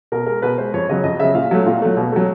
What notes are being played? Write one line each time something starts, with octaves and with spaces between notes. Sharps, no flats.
B2 A#4
G#3 A#4
B2 B4
G#3 C5
F2 C#5
C#3 F#3 D#5
F2 D#5
C#3 F#3 E5
A#2 F5
F#3 A3
A#2
F#3 A3
B2
F#3 A3